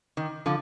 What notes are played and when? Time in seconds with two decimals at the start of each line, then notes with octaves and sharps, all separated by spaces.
0.17 D#3
0.46 D3 F3